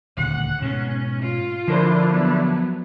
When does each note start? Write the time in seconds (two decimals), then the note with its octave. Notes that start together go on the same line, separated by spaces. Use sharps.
0.17 D#1 D2 F#5
0.62 G#2 B2 C#4
1.22 F4
1.68 D3 F3 A3 D4 E4 A#4 C5
2.10 F#3 B3